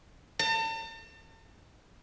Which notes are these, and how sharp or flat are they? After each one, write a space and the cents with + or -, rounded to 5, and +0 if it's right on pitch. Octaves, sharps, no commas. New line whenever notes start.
A5 +40